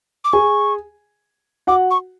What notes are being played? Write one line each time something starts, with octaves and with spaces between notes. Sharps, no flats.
D6
G#4 G#5 C#6
F#4 F#5 D6
C#6